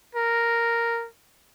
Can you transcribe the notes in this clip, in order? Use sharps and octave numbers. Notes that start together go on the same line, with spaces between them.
A#4